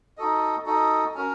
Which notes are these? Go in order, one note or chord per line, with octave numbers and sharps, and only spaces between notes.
D#4 F#4 A4 D#5
D#4 F#4 A4 D#5
C#4 F#4 A#4